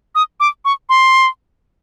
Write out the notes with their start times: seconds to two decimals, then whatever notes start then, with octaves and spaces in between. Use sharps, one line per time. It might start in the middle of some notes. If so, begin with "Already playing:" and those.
0.15 D#6
0.40 D6
0.65 C#6
0.89 C6